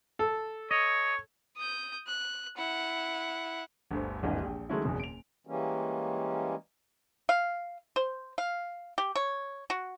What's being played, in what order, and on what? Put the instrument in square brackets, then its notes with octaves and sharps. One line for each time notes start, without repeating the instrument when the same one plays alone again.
[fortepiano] A4
[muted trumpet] C#5 [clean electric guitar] D#5
[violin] D#6 G6
F#6
E4 F#5
[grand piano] G1 D2 C5
D#1 G#1 G2 E3 D#5
A#1 G5
D#3 F#3 G#3 A3 C#4 E4
F#1 E2 B2
D7 F7
[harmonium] E3 G3 G#3 A#3 C#4
[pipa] F5
C5
F5
G4
C#5
F#4